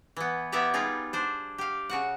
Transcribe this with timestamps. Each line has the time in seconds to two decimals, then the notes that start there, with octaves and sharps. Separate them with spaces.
0.17 E3 B3
0.52 B3 E4 G4 D5 E5 A#5
0.74 G3 D#4 F4 G#4
1.13 D4 C5
1.58 G4 F5
1.90 C#3 F#4 F#5